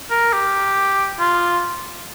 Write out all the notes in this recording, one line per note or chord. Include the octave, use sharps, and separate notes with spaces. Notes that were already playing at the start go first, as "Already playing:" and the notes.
A#4
G4
F4